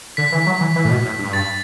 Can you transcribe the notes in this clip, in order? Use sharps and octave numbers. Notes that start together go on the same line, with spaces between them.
D3 B6
E3
F#3
E3
E3
A2
B2
A2
G2
A6